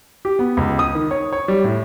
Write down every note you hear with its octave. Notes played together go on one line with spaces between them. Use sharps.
G4
B3
C#2
D#6
D#3
C#5
C#5
G3
A2